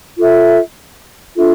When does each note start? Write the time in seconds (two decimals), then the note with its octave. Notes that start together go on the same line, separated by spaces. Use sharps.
0.18 F4 A4 E5
1.36 D4 F4 A4 E5